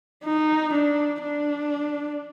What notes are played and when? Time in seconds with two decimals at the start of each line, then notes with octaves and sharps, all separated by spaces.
0.24 D#4
0.73 D4
1.23 D4